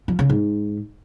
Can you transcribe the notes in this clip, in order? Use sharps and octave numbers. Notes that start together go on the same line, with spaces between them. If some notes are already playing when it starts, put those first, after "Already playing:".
F3
C#3
G#2